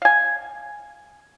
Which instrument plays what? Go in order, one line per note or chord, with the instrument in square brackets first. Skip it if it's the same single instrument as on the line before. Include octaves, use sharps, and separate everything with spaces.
[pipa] F5 G#5